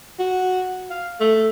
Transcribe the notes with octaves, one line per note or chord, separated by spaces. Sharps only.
F#4
F5
A3